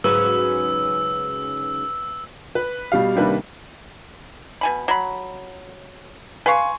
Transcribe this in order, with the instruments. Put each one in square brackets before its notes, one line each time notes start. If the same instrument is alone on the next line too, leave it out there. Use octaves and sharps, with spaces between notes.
[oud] G#2 C#3 F#3 [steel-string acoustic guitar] B4 [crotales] E6
[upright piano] B4
B2 G3 G4 F5
C3 D#3 G3 A#3 D4 B4
[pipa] B2 G#5 B5
F#3 B5
[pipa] B4 F5 [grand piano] G#5 C6 C#6